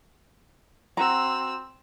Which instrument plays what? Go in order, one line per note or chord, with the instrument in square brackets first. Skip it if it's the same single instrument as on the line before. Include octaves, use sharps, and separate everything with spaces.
[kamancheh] C4 E6 [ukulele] F#4 A#5